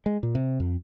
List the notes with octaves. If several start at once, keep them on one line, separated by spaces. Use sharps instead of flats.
G#3
A#2
C3
F2